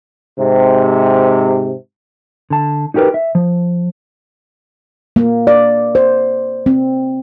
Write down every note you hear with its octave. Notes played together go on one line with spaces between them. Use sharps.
G#2 C3
D3 A5
D#4 F#4 G4 A#4 B4
E5
F3
A#3
D5
C5
C4